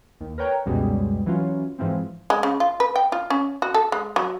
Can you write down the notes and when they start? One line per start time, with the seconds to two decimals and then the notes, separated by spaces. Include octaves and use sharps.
0.20 D#2
0.38 A#4 B4 C#5 G5 A#5
0.66 C#2 F#2 B2 G3 G#3
1.26 E3 F#3 C#4 F4
1.79 G#2 E3 F3 C4
2.30 G#3
2.43 C#3
2.60 F4
2.80 B4
2.96 G5
3.12 F4
3.30 C#4
3.62 F#4
3.74 A4
3.92 G#3
4.16 F#3